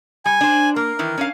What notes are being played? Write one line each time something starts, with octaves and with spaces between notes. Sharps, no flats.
G3 G#5
D4 C5
A#3 A#4
D#3 E3
C#4 D4 F5